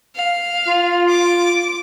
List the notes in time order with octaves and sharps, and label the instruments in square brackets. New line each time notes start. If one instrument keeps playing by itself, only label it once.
[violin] F5
[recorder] F4
[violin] D6